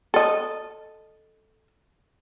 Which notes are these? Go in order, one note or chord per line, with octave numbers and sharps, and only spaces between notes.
A4 D#5